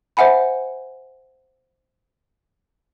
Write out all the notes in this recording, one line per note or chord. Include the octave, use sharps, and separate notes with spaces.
C5 E5 F#5 G#5 B5